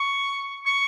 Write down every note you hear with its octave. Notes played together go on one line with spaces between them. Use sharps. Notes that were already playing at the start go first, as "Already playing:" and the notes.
Already playing: C#6
C#6